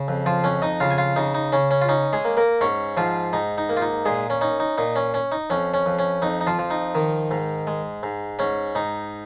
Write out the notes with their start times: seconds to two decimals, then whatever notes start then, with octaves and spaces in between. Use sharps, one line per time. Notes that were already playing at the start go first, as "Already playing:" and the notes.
Already playing: C#3
0.08 F2
0.26 F3 F4
0.44 F2 C#4
0.62 D#4 D#5
0.80 C#3 F4 F5
0.91 G#5
0.98 F4 F5
1.16 C#3 D#4
1.35 D#4
1.52 C#3 C#4
1.71 C#4
1.81 F4
1.89 C#4 D#4
2.13 G#3 G#4
2.25 A#3
2.37 A#3 A#4
2.61 G#2 C#4 C#5
2.97 G#2 F3 F4
3.33 G#2 D#4
3.58 D#4
3.69 A#3
3.77 F4
3.82 D#4
4.05 A#2 G#3 G#4
4.30 C#4
4.41 C#4 D#4
4.60 D#4
4.78 A#2 D#4
4.96 C#4
5.14 C#4
5.32 D#4
5.50 F2 C#4
5.74 C#4
5.86 F2
5.99 C#4
6.22 F2 D#4
6.41 D#4
6.47 F3 F4
6.59 F3
6.71 D#4
6.95 D#3
7.31 G#2
7.67 G#3
8.03 G#2
8.39 G#2 C#4
8.75 G#2 D#4